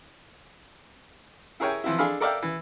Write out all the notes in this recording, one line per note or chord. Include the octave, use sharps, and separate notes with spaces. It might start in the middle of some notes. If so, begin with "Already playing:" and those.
E4 G#4 A#4 C#5 G5 G#5
E3 F3 C4 E4
D4 G#4 A4 F5 B5
A4 A#4 D5 E5 F5 G5
E3